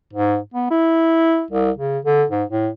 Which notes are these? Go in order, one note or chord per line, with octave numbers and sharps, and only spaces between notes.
G#2
B3
E4
C2
C#3
D3
G#2
A2